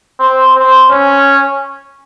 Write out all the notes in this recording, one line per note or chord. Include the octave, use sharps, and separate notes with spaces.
C4
C4
C#4